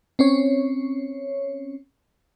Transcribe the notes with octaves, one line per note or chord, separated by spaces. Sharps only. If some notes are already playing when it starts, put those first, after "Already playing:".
C4 C#4 C#5